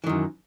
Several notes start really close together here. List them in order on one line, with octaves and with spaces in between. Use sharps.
E3 D#3 F#2